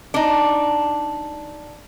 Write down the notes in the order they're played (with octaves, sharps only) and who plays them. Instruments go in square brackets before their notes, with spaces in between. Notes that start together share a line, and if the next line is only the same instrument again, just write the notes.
[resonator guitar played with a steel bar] D4 D#4